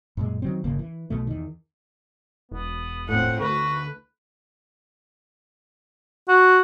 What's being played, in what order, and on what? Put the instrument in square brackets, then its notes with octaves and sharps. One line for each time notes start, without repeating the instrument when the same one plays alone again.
[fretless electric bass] F#2 A#2 G#3
D#3 F#3 C4
G1 D#2 C#3 A#3
E3
B1 B2 A3
E2 D#3
[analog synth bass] E1 [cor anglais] B3
[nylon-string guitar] A2 F4 [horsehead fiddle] C4 F#5
[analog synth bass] D2 [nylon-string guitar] A3 [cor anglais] F#4 [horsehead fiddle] B4
[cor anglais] F#4